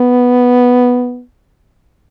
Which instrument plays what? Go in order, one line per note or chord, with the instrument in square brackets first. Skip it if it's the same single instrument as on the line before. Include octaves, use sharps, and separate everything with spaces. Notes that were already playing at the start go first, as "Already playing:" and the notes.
Already playing: [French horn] B3